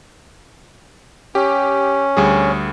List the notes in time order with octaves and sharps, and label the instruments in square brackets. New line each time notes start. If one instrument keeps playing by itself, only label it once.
[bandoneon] C#4 [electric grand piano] G4
[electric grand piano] D2 G3 G#4